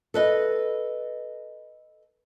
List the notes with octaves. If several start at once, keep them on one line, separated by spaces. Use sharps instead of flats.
A4 B4 D#5